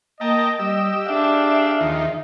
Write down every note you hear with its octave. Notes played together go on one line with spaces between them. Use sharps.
A#3 D#5 G5 A5 A#5
G3 G4 D#5 E6
D4 G#4 E5 F5
D#2 D#3 F3